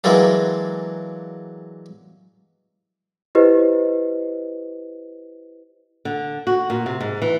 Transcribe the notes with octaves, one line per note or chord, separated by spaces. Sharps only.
E3 F#3 G#3 A#3 D4
E4 G4 B4 C5 D#5
D3
F#4
A#2
C3
G#2
E3